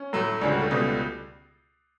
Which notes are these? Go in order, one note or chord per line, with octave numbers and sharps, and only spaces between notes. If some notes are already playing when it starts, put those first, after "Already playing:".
Already playing: C#4
A2 F#3 A3
C#2 C#3 G3 D4
F#4
A3
C#2 B2 G3